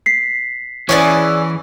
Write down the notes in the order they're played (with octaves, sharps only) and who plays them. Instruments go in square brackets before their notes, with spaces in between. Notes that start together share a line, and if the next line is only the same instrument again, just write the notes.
[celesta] B6 C7
[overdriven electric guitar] E3 [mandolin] B3 G#4 D5 [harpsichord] C#4